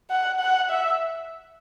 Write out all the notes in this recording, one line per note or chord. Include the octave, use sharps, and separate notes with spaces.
F#5
F#5
E5